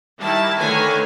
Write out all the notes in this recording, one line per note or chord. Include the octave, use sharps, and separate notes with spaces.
D#3 G3 E4 A5
D3 D#3 A3 B4 C#5 G#5